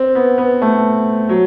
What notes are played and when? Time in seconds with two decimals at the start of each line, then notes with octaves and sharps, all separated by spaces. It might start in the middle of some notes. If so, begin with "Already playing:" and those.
Already playing: C4
0.15 B3
0.38 B3
0.62 A3
1.29 F#3